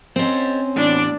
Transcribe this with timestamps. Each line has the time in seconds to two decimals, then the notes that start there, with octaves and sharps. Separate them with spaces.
0.16 C4 C#4 C5 D#5
0.76 E2 A2 B3 D4 D5